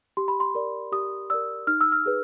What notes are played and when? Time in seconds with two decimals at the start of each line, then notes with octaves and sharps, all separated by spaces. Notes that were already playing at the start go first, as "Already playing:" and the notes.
0.17 G4 C6
0.28 B5
0.40 C6
0.55 A#4 D5
0.92 G4 D#6
1.30 A#4 D5 E6
1.67 D#4 F6
1.81 E6
1.92 F6
2.06 G#4 B4